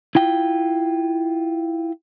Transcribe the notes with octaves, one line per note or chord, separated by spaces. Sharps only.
E4 F4 G5